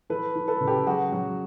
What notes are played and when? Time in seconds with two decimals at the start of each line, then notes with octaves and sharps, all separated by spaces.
0.10 E3 A4 B4
0.35 E3
0.48 A4 B4
0.60 C#3
0.67 G4 A4
0.86 F#3 F#4 G#4
1.12 F#3